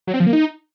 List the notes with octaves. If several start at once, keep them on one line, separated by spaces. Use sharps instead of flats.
F#3
C4
F3
A#3
D#4